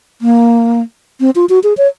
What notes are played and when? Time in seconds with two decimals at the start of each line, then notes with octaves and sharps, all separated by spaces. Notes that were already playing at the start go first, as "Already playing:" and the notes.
0.21 A#3
1.20 C4
1.36 F4
1.49 F#4
1.63 G#4
1.77 C#5